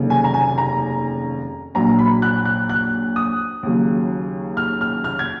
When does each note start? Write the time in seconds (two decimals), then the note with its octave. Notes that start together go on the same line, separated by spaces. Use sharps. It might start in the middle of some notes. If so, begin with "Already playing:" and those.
Already playing: F1 D#2 C#3 F#3
0.10 G#5
0.24 A#5
0.34 G#5
0.58 A#5
1.75 A#1 A#2 F#3 A#5
1.99 B5
2.22 F#6
2.45 F#6
2.69 F#6
3.16 D#6
3.63 D#2 C#3 F#3
4.57 F6
4.81 F6
5.04 F6
5.19 G#6